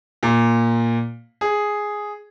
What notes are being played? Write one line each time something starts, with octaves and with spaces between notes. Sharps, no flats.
A#2
G#4